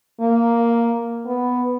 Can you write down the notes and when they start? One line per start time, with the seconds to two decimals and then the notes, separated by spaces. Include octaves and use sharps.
0.20 A#3
1.25 B3